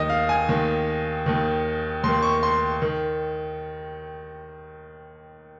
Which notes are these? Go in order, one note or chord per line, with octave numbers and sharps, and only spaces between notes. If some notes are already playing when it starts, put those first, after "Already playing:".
Already playing: D#2 D#3 D#5
F5
G#5
D#2 D#3
D#2 D#3
D#2 D#3 C6
C#6
C6
D#3